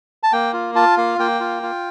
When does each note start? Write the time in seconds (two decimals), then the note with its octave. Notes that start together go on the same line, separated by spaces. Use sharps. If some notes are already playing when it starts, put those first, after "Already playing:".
0.23 A5
0.32 A#3 G5
0.53 F4
0.75 F4 A5
0.97 A#3 F5
1.19 A#3 G5
1.40 F4
1.63 F4